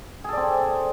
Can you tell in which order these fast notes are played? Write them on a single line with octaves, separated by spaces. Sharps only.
G#4 A4 D5 C4